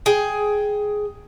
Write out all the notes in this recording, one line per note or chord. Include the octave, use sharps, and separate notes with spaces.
G#4 G5